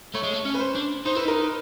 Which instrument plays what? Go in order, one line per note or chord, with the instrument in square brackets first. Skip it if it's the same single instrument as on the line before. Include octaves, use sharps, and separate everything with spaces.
[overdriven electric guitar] A3 [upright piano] C#5
[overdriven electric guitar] G#3
A3
C#4
[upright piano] B4
C5
[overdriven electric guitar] D4
[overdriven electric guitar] D#4 [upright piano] C5
[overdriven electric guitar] E4 [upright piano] B4
[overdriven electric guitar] D#4 [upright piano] A#4
[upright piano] B4